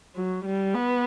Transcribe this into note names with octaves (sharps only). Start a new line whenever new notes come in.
F#3
G3
B3